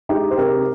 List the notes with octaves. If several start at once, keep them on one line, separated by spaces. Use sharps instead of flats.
G#3 D#4 G4
C5
C3 G4 A#4